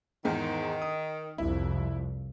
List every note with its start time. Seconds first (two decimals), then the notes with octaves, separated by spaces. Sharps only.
0.25 E2 G#2 D#3
0.82 D#6
1.38 C2 F2 E4